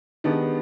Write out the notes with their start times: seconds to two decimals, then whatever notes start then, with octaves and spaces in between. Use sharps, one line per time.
0.24 D#3 G#3 B3 D4 G4